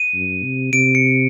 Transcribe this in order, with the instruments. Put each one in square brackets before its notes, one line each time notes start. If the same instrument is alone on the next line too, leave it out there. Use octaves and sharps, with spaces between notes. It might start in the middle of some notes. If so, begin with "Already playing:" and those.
Already playing: [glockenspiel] D#7
[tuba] F#2
C3
[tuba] C3 [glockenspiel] D7
[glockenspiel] C#7